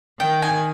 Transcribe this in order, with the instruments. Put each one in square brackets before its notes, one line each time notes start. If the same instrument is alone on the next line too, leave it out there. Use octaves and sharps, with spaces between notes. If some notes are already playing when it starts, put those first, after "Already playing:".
[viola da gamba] D#3 [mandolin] G5
[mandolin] G#5